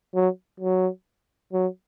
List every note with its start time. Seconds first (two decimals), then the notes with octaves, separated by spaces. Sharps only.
0.14 F#3
0.60 F#3
1.53 F#3